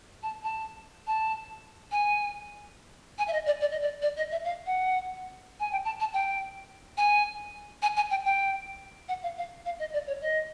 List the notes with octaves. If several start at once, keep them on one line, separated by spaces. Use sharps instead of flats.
A5
A5
A5
G#5
G#5
E5
D#5
D5
D5
D#5
D5
D5
D#5
E5
F5
F#5
G#5
G5
A5
A5
G5
G#5
G#5
G#5
G5
G5
F#5
F5
F5
F5
D#5
D5
C#5
D#5